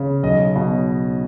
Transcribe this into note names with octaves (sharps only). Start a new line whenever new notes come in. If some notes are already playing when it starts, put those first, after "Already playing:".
Already playing: C#3
B1 D#5
B2